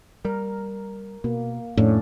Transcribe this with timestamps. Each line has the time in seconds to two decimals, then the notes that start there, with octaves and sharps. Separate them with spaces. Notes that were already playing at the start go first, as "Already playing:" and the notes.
0.25 G3 A#4
1.24 B2 A#3
1.77 F2 A2 A3 C#4 D4